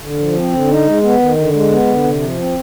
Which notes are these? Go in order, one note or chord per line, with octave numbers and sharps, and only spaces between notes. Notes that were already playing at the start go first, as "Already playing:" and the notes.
D3
F3
C4
D3
D#4
G#3
B3
D#3
D3
G#3
B3
D3
C3
F3
C4